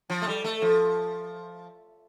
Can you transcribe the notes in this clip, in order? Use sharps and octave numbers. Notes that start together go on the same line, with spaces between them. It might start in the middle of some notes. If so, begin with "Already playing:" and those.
F3
A3
G3
A3
F3